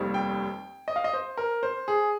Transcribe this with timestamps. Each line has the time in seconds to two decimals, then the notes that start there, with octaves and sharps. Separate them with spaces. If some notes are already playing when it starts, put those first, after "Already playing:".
Already playing: F1 D#2 D#3 G3 C4
0.14 G5
0.88 D#5
0.96 F5
1.04 D#5
1.13 C5
1.37 A#4
1.63 C5
1.88 G#4